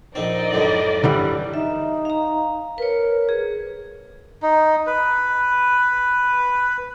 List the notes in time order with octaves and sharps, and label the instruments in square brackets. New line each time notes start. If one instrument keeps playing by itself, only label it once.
[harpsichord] A#1 C4 [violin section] D#4 D5 D#5
[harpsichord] C#2 F#2 A2
[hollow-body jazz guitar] D3 E3 G3
[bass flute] D#4 [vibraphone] E5
[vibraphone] F5 A#5
[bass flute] A#4 [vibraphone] B4 C#5
[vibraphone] G#4
[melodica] D#4
B4